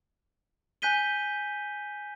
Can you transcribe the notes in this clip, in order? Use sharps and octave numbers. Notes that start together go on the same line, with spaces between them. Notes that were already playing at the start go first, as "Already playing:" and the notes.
G#5 F#6 G6 B6 D#7 G7